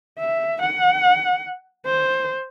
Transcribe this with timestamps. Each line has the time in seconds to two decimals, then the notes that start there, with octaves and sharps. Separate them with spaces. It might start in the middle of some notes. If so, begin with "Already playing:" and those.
0.19 E5
0.62 F#5
1.86 C5